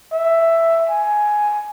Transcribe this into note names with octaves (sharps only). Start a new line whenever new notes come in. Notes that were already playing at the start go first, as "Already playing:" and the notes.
E5
G#5